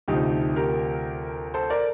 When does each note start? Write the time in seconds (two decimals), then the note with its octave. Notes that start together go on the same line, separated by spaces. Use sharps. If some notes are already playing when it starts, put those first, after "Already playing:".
0.08 D2 C3 F3 D#4 G4
0.56 G4 A#4
1.54 A4 C5
1.70 A#4 D5